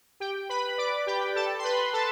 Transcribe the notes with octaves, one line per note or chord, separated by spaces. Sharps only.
G4 G5
B4 B5
D5 D6
G4 G5
A4 A5
C6
B4 B5
A4 A5